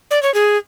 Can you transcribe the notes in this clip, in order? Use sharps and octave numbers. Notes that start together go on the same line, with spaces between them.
D5
C#5
G#4